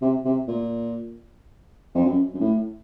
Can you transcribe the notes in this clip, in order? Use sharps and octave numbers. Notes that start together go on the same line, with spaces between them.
C3
C3
A#2
F2
F#2
F#2
A2